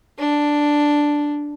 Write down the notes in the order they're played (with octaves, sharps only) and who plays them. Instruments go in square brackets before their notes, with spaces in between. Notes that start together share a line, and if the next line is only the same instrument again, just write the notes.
[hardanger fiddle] D4